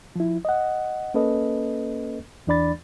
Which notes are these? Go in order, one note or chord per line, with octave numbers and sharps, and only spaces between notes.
F3 E4
D#5 F#5
A#3 C#4 A4 B4 D#5
E2 E3 D4 D5 B5 A6